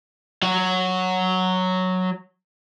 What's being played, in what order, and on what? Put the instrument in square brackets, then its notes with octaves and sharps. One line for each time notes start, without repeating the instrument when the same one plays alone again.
[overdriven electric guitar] F#3 F#4